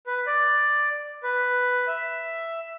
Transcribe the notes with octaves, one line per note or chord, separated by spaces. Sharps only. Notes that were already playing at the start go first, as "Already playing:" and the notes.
B4
D5
B4
E5